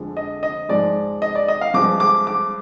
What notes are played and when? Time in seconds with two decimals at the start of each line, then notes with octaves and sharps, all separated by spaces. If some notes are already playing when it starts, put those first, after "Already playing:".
Already playing: F2 D3 F3 G#3
0.17 D#5
0.43 D#5
0.69 G#2 F3 G#3 D5
1.22 D#5
1.35 D5
1.48 D#5
1.61 F5
1.74 G2 F3 G#3 D6
2.00 D6
2.27 D6